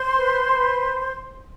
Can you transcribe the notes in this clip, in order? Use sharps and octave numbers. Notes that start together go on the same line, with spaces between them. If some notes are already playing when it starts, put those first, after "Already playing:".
Already playing: C5 C6
B4
B4